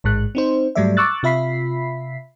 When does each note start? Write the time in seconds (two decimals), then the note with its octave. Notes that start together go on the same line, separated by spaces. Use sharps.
0.04 A1 G#2 G#3 F#6
0.35 C4 D#4 C5
0.75 G#2 F#3 G3 A3 D5 E5
0.97 C#6 D6 E6 F#6 A6
1.23 C3 F4 E5 B5 B6 C7